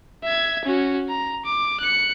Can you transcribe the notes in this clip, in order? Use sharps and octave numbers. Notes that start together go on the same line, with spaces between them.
E5 G#6
C#4 F#4
A#5
D6
F#6 C#7